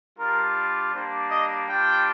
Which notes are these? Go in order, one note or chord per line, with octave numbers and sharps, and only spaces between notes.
G3 D4 F4 A#4
G3 A#3 D4 C5
D#5
G3 D4 F4 G5